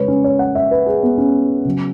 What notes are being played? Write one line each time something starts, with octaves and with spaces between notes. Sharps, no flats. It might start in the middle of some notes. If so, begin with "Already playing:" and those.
Already playing: C#3 G#3 B4 C#5
C#4
C#5
F#5
E5
B4
G#4
B3
C#4
C#3 F#3